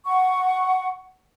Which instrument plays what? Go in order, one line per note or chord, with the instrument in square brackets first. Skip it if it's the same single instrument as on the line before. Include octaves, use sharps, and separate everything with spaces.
[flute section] F#5 C#6